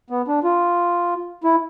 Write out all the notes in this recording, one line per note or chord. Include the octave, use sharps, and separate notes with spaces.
B3
D4
F4
E4